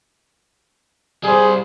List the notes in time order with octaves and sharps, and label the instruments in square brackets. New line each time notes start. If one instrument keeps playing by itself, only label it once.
[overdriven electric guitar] G3 C5 [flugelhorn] G#4